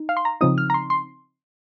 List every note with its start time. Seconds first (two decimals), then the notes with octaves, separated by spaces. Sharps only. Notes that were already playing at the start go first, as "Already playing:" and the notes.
Already playing: D#4
0.09 F5
0.17 C6
0.25 A#5
0.41 C#3 F3 C4 D#4 D#6
0.58 F6
0.70 A#5
0.74 C6
0.90 C6